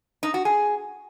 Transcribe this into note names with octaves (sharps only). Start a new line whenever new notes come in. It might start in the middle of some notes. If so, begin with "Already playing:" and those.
D#4
F#4
G#4